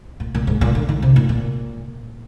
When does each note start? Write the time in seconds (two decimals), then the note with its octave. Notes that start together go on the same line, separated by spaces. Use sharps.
0.20 A#2
0.35 A#2
0.47 G#2
0.61 A#2
0.75 D3
0.89 D#3
1.02 C3
1.16 A#2
1.29 A#2